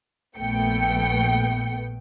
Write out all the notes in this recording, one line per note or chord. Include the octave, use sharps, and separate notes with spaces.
A#1 A3 B3 G5 C#7